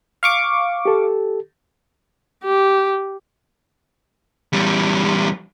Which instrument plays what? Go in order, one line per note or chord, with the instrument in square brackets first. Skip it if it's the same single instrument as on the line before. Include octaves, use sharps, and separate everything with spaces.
[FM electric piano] F5 C#6 D6
[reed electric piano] G4 A4
[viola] G4
[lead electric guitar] E2 G3